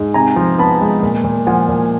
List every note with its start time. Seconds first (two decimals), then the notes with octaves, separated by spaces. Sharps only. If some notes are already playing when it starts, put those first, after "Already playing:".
Already playing: G#2
0.14 C3 G#5 A#5
0.36 F3
0.58 B3 A5 B5
0.81 G#3
1.03 A#2
1.24 A#2
1.47 F3 F#5 G#5
1.69 A#2